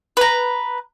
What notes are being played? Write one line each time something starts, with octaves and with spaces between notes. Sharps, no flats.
B4 A#5